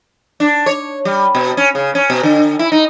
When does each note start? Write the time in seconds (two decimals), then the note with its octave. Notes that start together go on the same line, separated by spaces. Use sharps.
0.40 D4
0.66 C#5
1.05 G3
1.35 B2
1.57 C#4
1.75 C#3
1.95 C#4
2.10 B2
2.23 D3
2.59 E4
2.72 D#4